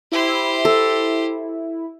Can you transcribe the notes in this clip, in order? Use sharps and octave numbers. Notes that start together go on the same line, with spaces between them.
E4 G4 C5
A4